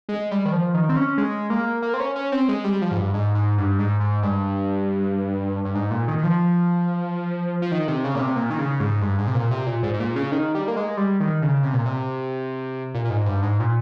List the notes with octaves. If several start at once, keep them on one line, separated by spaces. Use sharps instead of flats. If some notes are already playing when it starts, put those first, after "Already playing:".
G#3
G3
D#3
F3
D#3
C4
C#4
G#3
A#3
A#3
C4
C#4
C#4
C4
G#3
G3
F3
G#2
G2
G#2
G#2
G2
G#2
G#2
G2
G2
G#2
A#2
D#3
D#3
F3
F3
D#3
C3
C#3
A#2
C3
A#2
D#3
C#3
G#2
G2
G#2
C3
A#2
C3
A#2
G#2
G#2
A#2
C#3
D#3
G3
A#3
G#3
G3
D#3
C#3
C3
A#2
C3
A#2
A#2
G#2
G2
G#2
A#2